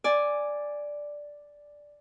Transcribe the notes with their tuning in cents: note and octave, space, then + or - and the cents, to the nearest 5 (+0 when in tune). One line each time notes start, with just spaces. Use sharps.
D5 +0 G#5 +0